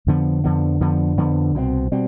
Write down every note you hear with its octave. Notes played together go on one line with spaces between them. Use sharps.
F2 D3 F3 B3
F2 D3 F3 B3
F2 D3 F3 B3
F2 D3 F3 B3
C2 B2 G3 C4
B2 G3 C4